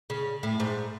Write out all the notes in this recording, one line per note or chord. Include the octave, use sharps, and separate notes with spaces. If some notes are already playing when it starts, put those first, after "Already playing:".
C#3
A2
G#2